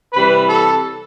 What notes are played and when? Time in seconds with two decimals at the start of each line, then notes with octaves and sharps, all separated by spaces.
0.13 C3 E3 G3 B4
0.48 A4